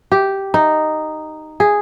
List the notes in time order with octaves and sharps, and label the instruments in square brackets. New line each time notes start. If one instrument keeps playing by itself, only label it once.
[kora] G4
D#4
G#4